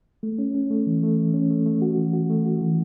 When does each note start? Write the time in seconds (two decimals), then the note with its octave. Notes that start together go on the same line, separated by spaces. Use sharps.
0.23 A3
0.38 C#4
0.54 C#4
0.70 A3
0.86 E3
1.03 A3
1.18 A3
1.34 C#4
1.50 A3
1.66 A3
1.82 F#4
1.98 E3
2.13 F#4
2.30 A3
2.45 F#4
2.61 E3